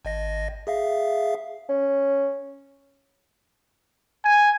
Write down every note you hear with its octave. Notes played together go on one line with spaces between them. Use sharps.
G#1 D#5 A#6
G#4 E5 F5
C#4
G#5